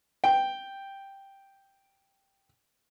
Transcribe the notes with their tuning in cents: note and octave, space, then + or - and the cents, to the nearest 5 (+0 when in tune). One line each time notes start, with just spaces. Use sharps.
G5 +0